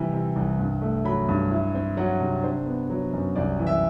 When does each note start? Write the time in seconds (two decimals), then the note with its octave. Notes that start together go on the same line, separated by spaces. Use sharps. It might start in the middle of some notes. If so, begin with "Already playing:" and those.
Already playing: C3 E3 G3
0.13 C3
0.36 C2
0.59 G2
0.82 A3
1.04 F#3 B5
1.28 G2
1.51 E4
1.75 C4
1.97 F#3 F#5
2.20 C3
2.43 D4 C5
2.66 B3
2.90 F#3
3.13 F#2
3.36 C2 D5
3.59 E3
3.67 E5